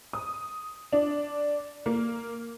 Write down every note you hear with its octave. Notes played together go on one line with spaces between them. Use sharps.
D#6
D4
A#3